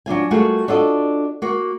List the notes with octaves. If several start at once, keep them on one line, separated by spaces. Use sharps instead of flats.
F#3 D4 F4 G#5
G3 A3 A#3 F4 F#4 G#4
D4 F4 F#4 A4 D5 D#5
A#3 F#4